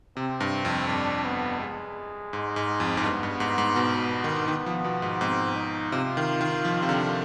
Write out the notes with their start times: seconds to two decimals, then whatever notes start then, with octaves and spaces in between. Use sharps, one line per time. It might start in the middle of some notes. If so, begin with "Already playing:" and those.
0.17 C3 C4
0.40 G2
0.65 F2
0.88 G2 D4
1.25 B3
1.60 G#3
2.33 G#2
2.56 G#2
2.80 F2
2.97 G#2
3.04 G2 B3
3.23 G2
3.40 G#2
3.58 G#2
3.76 B2
4.24 D#3
4.48 D#3 B3
4.66 F3
4.84 B2
5.02 G#2
5.20 G#2 C4
5.56 D#4
5.92 C3 F4
6.17 D#3
6.41 D#3
6.65 F3
6.82 C3
6.89 D3